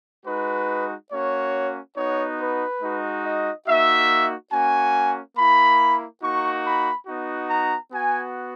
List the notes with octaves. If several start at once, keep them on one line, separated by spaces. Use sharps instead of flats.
G#3 D#4 F#4 B4
A#3 C#4 F#4 C#5
B3 D#4 F#4 C#5
B4
G#3 D#4 F#4
D#5
A#3 D#4 F#4 E5
A#3 C#4 F#4 G#5
A#3 E4 B5
A#3 D#4 F#4 C#6
B5
B3 D#4 F#4
A#5
B3 F#4 G#5